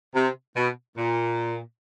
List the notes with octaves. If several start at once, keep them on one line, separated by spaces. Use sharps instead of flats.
C3
B2
A#2